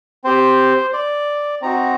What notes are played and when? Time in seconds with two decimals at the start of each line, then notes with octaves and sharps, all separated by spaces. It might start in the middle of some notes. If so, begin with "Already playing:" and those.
0.24 C4 G4 C5
0.93 D5
1.62 C4 D#4 F#4 A#5